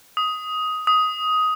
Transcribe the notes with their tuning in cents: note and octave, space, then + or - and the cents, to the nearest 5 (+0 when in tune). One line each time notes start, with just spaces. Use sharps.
D#6 +10
D#6 +10